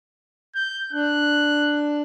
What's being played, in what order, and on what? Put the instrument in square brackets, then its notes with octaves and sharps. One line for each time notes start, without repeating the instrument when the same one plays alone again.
[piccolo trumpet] G6
[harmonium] D4 [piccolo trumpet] F#6